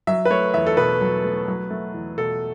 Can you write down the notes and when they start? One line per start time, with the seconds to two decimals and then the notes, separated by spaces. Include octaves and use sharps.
0.07 F#3 E5
0.25 B4
0.30 A3 C#5
0.54 E2 E5
0.66 A4
0.77 B2 B4
1.01 F#3
1.24 A3
1.48 F#3
1.71 A3
1.94 E2
2.17 B2 A4